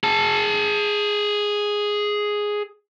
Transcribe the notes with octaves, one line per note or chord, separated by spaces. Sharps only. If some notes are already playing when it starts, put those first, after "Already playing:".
G#4 A5